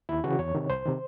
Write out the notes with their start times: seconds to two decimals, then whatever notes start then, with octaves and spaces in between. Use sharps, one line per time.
0.09 D#2 E4
0.24 C#3 E3 F#4
0.39 E2 C#5
0.55 C3 D#3
0.70 C2 C5
0.85 C3 D#3